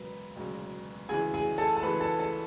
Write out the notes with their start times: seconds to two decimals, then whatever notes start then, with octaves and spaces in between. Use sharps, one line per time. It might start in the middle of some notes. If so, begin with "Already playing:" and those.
Already playing: E1 D2 C#3 F#3 B4 B5
0.35 E1 D2 C#3 F#3
1.09 D2 C#3 E3 G#4 G#5
1.34 G#4 G#5
1.58 A4 A5
1.77 A5
1.82 D2 C#3 E3 B4 B5
2.00 A4 A5
2.19 A4 A5